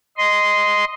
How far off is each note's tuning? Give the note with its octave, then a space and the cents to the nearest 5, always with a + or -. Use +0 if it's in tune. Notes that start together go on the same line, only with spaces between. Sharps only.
D#5 +0 C6 -10